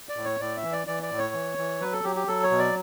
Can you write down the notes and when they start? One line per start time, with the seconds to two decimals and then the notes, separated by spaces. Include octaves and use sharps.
0.09 D5
0.17 A2
0.24 C#5
0.40 A2 D5
0.57 E5
0.63 E3
0.72 D5
0.87 E3 D5
1.03 D5
1.11 A2
1.18 C#5
1.34 E3
1.58 E3
1.80 F#3 B4
1.93 A4
2.04 F#3 G4
2.16 G4
2.27 F#3 A4
2.43 C#5
2.51 B2
2.59 D5